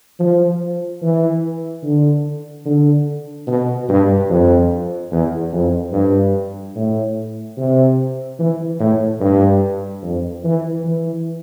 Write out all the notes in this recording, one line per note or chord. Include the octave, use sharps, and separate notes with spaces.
F3
E3
D3
D3
B2
G2
F2
E2
F2
G2
A2
C3
E3
A2
G2
F2
E3
E3